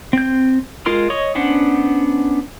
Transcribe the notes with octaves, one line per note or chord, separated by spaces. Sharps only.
C4 G6
G#3 F4 A#4 C6 F6
C#5 D#5 C#6 D#6
B3 C#4 D4 C5 F#5